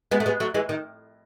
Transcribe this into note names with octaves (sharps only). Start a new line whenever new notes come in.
G#3 B3
A3
G#3 B3
F#3 A3
E3 G#3
D#3